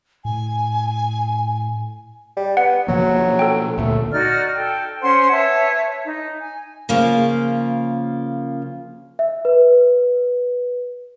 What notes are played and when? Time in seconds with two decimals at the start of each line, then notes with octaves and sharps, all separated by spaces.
0.25 A2 G#5
2.37 G3
2.57 B3 F#5
2.88 B2 F3 F#3 A#3
3.39 A4 G5
3.78 D2 A#2 A3
4.12 D#4 F#4 D5 F6
4.56 A4 G5
5.02 C#4 C5 F#5 C6
5.32 B4 C#5 E5 A5
6.04 D#4
6.40 G#5
6.89 C#3 F3 A#3 F4
9.19 E5
9.45 B4